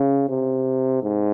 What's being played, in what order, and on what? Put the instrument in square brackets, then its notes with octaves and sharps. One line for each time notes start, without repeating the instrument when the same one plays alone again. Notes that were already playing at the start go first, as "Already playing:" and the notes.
Already playing: [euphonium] C#3
C3
G#2